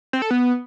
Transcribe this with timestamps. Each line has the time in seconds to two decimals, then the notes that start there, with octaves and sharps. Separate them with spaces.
0.13 C4
0.22 A4
0.31 B3